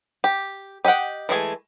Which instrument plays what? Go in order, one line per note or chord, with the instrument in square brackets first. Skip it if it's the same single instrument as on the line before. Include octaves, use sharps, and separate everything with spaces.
[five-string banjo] G4
G4 D#5 E5 F#5 G5
E3 G#3 A3 G#4 G#5